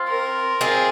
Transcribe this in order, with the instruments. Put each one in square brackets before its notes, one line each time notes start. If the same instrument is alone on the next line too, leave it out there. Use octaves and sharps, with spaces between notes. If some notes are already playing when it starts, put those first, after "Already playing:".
Already playing: [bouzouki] C4 F4
[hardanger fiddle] A#4
[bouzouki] C4 F4 [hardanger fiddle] G#4